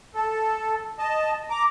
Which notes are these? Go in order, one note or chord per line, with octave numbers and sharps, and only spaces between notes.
A4
D#5 A5
A#5 D6